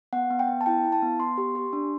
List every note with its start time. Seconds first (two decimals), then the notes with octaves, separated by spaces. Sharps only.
0.13 B3 F#5
0.30 B3
0.39 G5
0.48 B3
0.61 A5
0.66 E4 G5
0.84 E4
0.92 A5
1.02 B3
1.19 B3 C6
1.38 G4
1.55 G4
1.73 D4